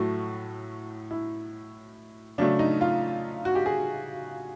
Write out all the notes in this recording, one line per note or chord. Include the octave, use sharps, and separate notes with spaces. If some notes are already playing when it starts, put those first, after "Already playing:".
Already playing: A2 F#3 A3 F#4
E4
C#3 F#3 A3 D4
D#4
F4
F#4
G4
G#4